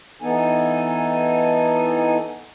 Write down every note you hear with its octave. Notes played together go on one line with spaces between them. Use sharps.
E3 B3 D#4 A4 G#5